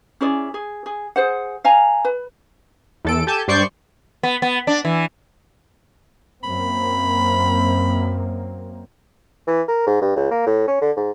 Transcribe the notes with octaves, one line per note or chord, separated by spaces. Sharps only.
C#4 E4 G#4 D5
G#4
G#4
G#4 C5 F#5
F5 G#5 A#5
B4
E2 A4 D7
G4 A4 G#5 A5 G6
G2 C5 D5 C#6 G6 C7
B3
B3
D4
E3
F#2 A#3 C4 B5
E3
A#4
G#2
G2
C#2
A#3
A2
C#4
D3
G#2